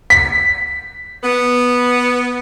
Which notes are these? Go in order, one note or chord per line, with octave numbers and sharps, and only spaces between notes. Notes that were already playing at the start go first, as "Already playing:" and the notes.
B6
B3